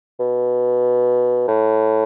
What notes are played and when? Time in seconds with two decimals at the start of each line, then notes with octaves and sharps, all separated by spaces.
0.20 B2
1.48 A2